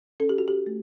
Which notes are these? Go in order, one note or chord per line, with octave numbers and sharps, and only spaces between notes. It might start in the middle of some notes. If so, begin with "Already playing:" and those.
C#4 A4
G4
F#4
G4
A3